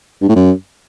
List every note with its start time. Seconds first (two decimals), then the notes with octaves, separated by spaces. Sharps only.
0.22 G2
0.29 A2
0.36 F#2